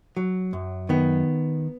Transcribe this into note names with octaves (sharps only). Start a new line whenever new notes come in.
F#3
F#2
D#3 B3